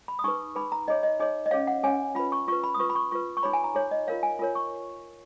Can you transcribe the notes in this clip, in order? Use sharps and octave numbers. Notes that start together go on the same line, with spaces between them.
B5
D#6
D#4 G#4 B4 C#6
D#4 G#4 B4 B5
A#5
D#4 G#4 C#5 D#5
D#5
D#4 G#4 C#5 D#5
D#5
C#4 G#4 C#5 F5
F#5
C#4 G#4 C#5 G#5
F4 B4 B5
C#6
F4 B4 C#6
B5
D#6
F4 B4 C#6
B5
C#6
F4 B4 C#6
C#6
D#4 G#4 C#5 B5
G#5
A#5
D#4 G#4 C#5
D#5
F4 A#4 C#5 F5
G#5
F4 A#4 C#5
C#6